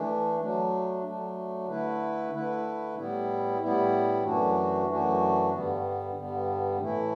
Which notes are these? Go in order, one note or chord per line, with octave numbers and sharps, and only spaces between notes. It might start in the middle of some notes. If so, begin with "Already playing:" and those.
Already playing: E3 A3 D4
F#3 A3 D4
F#3 A3 D4
D3 A3 E4 B4
D3 A3 E4 B4
A2 G3 B3 E4
A2 G3 B3 E4
F#2 E3 A3 D4 F#4
F#2 E3 A3 D4 F#4
G2 D3 G3 B3
G2 D3 G3 B3
A2 E3 A3 E4